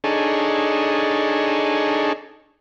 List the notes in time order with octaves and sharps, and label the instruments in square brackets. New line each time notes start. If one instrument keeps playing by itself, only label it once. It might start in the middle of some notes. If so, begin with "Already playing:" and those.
[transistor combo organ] D4 D#4 G#4 A4 C#5